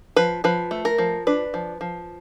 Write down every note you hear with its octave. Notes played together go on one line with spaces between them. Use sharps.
F3 B4
F3 B4
A3
A#4
F3
D4 B4
F3
F3